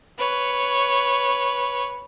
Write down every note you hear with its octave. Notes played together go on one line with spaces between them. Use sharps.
B4 C#5